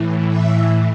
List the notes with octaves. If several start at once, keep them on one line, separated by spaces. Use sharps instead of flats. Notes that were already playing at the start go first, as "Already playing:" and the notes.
Already playing: A2 E3
E5